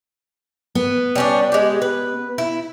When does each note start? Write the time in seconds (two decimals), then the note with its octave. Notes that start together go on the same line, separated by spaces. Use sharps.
0.75 B3
1.15 G3 C#4 D4
1.52 G#3 G4
1.82 B4
2.38 E4